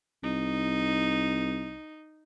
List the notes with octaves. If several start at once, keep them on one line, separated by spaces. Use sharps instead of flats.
C2 D#4